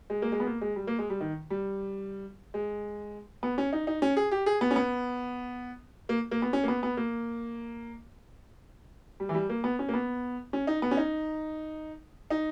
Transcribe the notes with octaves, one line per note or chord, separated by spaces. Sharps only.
G#3
A#3
G#3
B3
A#3
G#3
G3
A#3
G#3
G3
D#3
G3
G#3
B3
C#4
D#4
D#4
C#4
G#4
G4
G#4
B3
C#4
B3
A#3
A#3
B3
C#4
A#3
B3
B3
A#3
G3
E3
G3
A#3
B3
C#4
A#3
B3
C#4
D#4
B3
C#4
D#4
D#4